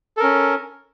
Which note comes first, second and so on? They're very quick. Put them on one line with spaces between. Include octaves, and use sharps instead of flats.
A4 A#4 C#4